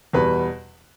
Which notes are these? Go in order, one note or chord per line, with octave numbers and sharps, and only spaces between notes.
E2 B2 G3 B4